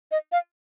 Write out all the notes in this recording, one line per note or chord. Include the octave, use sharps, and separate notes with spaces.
D#5
F5